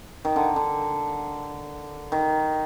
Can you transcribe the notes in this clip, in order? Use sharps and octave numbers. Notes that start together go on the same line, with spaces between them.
D#3
D3
D3
D#3